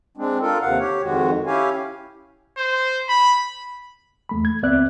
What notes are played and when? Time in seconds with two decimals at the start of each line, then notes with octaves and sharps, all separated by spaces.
0.17 G#3 C4 D4
0.41 D4 F4 A4 A#4
0.62 D#2 C3 F5 F#5
0.79 G4 C#5
1.03 F2 D#3 G#3 F#4
1.46 C#4 E4 G4 C#5 F5 G#5
2.58 C5
3.09 B5
4.29 E2 A3 B5
4.45 G#6
4.63 C#2 B3 C4 D5 E5 F#6